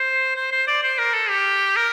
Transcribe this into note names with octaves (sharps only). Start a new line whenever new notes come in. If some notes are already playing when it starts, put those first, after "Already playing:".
Already playing: C5
C5
C5
D5
C5
A#4
A4
G4
A#4